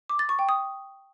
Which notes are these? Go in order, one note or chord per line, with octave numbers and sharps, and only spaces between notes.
D6
A6
C#6
G5
D#6